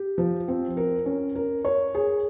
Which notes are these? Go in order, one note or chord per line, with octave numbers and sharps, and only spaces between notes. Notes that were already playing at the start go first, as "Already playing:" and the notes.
Already playing: G4
F3
C4
A#4
C#4
A#4
C#5
G#4